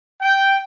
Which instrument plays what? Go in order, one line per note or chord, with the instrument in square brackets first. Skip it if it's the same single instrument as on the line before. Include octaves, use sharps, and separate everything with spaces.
[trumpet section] G5